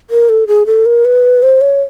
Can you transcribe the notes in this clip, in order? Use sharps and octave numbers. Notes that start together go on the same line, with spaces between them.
A#4
A4
G#4
A4
A#4
B4
C5
C#5